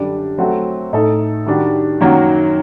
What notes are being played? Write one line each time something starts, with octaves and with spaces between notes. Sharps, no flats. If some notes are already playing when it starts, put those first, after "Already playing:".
Already playing: F#2 D3 G3 D4
F#3 A3 C4 F#4
A2 A3 D#4 A4
D#3 G3 D4 F#4
F#2 D#3 F#3 A#3 F#4